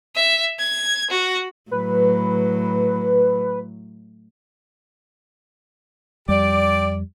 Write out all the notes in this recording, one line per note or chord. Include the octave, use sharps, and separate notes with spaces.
E5
G#6
F#4
A2 F#3 B4
F2 G3 G4 D5